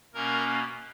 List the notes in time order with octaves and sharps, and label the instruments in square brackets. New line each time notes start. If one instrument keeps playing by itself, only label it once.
[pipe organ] B2 A#3 C#4 A#4 A#5